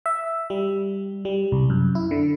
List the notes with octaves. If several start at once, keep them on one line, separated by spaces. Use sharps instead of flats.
E5
G3
G3
C2
F#2
E4
D3